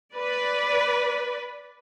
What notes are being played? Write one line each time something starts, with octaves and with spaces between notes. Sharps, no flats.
B4 D5